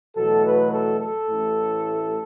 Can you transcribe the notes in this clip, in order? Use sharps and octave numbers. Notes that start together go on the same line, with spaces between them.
E2 B2 F#3 A3 A4
B4
A4
A4
A1 A2 A3